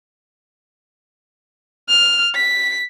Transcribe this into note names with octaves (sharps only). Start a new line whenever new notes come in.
F6
B6